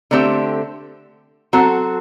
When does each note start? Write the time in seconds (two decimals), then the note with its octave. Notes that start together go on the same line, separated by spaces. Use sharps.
0.11 D3 A3 C4 G4
1.53 F#3 C4 F#4 A4